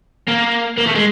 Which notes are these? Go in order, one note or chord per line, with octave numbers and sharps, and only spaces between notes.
A#3
A#3
A3
G#3